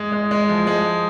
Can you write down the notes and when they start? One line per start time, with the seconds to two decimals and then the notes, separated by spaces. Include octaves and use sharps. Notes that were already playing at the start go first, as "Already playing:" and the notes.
Already playing: G#3
0.12 G#3
0.31 G#3
0.49 F3
0.67 G#3